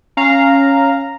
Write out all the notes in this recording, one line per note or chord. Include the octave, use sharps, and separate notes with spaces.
C#4 F5 A#5